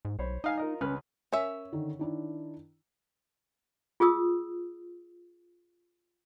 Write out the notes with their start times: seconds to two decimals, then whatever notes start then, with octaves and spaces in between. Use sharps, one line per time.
0.05 G#2
0.19 B1 C5 C#5 B5
0.44 D#4 D#5 F5 G#5
0.58 F4 A#4 D#5
0.81 C#2 C#4 B4 F6
1.32 C#4 A#4 E5
1.73 D3 D#3
1.99 D#3 D4 E4
4.00 F4 G#4 D#6 E6